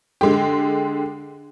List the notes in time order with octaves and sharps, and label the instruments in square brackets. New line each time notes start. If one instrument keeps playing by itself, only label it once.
[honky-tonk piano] D3 G#3 G4